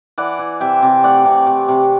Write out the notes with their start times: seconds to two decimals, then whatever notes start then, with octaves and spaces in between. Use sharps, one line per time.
0.18 E3 D5 F#5
0.39 E3
0.60 C3 E5 G5
0.82 C3
1.03 A3 D5 F#5
1.25 C3
1.47 C3
1.68 C3